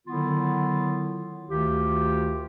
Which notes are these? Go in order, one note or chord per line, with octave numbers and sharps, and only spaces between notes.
D3 D#3 F#3 B3 E4 F4
D2 D#3 F4 G4